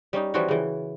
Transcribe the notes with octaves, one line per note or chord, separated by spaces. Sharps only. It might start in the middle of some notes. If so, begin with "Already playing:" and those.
G3 C#4 D#4
E3 F3 G3 C#4 F4 F#4
C#3 E3